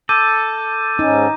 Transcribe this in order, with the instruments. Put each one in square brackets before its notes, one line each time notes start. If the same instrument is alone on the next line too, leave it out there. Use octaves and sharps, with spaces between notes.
[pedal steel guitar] A4 [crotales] D6 G6 D#7
[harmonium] G#2 C#4 [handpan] D#4